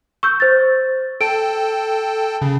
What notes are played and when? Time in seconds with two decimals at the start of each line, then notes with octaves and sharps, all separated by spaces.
0.23 C#6 E6 G6
0.40 C5 A6
1.21 A4 G5 A5 D7
2.42 C#3